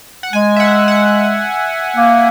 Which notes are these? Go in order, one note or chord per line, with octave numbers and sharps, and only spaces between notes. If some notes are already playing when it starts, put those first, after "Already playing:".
F#5
G#3 G#5
E5
F#5
F#5
A#3